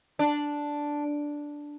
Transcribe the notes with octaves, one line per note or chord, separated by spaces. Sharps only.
D4